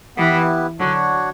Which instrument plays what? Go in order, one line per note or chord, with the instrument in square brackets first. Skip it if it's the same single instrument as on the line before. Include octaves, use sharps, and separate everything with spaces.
[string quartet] E3 [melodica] B3 E4 G4 B4
[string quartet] D3 F#3 [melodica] D4 F#4 C#5 F#5